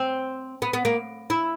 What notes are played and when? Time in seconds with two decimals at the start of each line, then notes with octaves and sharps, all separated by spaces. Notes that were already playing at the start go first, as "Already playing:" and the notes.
Already playing: C4
0.62 B3
0.73 B3
0.85 A#3
1.30 E4